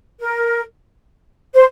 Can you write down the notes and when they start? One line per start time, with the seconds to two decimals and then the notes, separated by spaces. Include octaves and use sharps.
0.21 A#4
1.54 C5